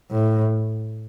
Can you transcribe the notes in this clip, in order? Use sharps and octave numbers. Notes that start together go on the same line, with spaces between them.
A2